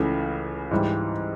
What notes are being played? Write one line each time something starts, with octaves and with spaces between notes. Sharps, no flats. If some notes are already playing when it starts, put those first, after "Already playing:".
Already playing: C#2 C#3 E3 A3
G#2 E3 G3